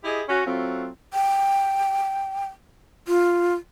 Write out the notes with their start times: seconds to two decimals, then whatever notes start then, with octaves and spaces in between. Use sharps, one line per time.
0.04 E4 G4 G#4 D#5
0.28 C#4 F#4
0.46 F#3 A3 C4 F4
1.14 G5
3.08 F4